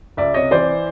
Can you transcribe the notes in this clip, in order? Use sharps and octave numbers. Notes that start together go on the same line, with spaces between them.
C#2 D5 E5
C3 C#5 D#5
E3 C5 D5